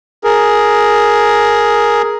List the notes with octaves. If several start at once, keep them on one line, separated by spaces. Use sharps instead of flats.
G#4 A#4